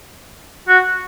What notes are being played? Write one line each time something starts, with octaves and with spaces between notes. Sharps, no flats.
F#4